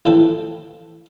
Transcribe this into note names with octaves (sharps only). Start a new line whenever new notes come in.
A1 D3 E3 F3 A4 G5